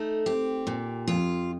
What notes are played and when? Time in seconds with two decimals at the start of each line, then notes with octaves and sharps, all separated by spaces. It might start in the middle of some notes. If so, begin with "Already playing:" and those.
Already playing: A3 D#4
0.26 C4 G4
0.67 A#2
1.08 F2 F4